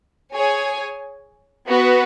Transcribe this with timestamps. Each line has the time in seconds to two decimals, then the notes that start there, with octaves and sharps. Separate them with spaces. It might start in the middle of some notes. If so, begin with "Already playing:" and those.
0.33 G#4 C#5 G#5
1.68 B3 F#4 B4